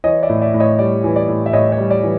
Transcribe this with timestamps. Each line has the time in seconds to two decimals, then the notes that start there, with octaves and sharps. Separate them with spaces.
0.04 E3 C#5 D#5
0.23 D5 E5
0.29 A2
0.41 D5 E5
0.54 A2
0.60 C#5 D#5
0.79 G3 D5
1.04 E3
1.16 D5
1.28 A2
1.46 E5
1.53 A2 C#5 D#5
1.72 C#5
1.78 G3
1.91 D5
2.03 E3